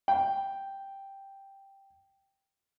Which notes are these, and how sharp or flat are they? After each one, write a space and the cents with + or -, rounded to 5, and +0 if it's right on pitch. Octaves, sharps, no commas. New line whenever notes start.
G5 +0